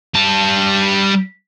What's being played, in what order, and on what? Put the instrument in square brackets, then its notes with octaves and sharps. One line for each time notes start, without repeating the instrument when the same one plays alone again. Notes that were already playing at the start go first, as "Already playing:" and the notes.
[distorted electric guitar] G3 A5